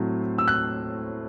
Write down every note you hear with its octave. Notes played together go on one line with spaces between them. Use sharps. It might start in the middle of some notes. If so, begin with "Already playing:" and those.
Already playing: A2 F#3 A3 C4
E6
F#6